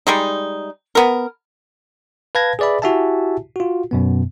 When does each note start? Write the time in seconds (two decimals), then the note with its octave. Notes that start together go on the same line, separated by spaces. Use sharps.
0.07 G3 G#3 D#4
0.95 B3 A#4
2.35 B4 F5 A5 G#6 A#6
2.59 G#4 B4 D5 E5 B5
2.82 E4 F#4 G4 E5 G#5 A5
3.56 F4 F#4
3.91 F#2 B2 B3